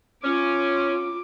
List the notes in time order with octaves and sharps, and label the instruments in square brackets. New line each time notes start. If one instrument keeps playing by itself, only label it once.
[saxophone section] C#4 [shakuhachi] F4 [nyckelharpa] D6